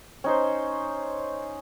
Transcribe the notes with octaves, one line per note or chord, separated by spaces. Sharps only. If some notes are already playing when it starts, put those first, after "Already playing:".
C#4 D#4 C5